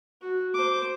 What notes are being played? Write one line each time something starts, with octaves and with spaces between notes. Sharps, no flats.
F#4
C5 D6